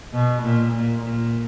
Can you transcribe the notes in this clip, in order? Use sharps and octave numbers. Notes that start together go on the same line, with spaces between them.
B2
A#2
A#2
A#2